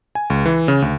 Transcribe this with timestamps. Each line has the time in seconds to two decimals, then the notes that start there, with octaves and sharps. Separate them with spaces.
0.15 G#5
0.30 C#2
0.45 E3
0.68 C#3
0.82 D2